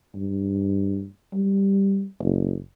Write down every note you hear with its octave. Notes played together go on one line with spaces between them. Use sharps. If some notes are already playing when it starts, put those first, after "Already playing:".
G2
G3
F#1